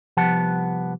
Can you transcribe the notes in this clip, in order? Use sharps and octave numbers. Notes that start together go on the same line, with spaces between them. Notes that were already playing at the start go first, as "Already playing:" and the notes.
C2 F3 B3 G4 F#5 A5